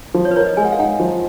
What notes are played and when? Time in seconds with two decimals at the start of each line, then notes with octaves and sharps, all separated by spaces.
0.14 F3
0.25 C#5
0.31 B4
0.36 A#4 C#5
0.46 D#5
0.57 G#3 G#5
0.65 F#5
0.72 F5
0.79 D#4 F#5
1.00 F3